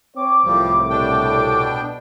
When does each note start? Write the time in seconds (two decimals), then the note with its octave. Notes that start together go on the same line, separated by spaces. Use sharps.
0.16 C4 C5 C#5 D6
0.45 C2 A2 F3 G3
0.90 B2 D4 G5